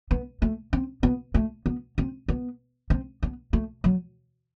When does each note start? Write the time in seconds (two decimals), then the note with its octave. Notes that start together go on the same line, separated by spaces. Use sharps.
0.11 B3
0.42 A3
0.73 C4
1.03 B3
1.34 A3
1.66 B3
1.98 C4
2.28 B3
2.90 C4
3.23 B3
3.53 A3
3.84 F#3